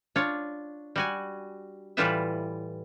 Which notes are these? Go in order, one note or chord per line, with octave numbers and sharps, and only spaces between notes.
D4 F4 C#5
G3 F#4 G#5
A2 E3 G3 F4 B4 E5